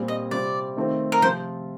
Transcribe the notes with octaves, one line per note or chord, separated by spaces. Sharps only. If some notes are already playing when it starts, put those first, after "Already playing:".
Already playing: A#2 G3 C4 F4
D#5
C3 G3 C4 F4 D5
D#3 A3 C4 F4
A#4
C3 F3 C4 F4 C5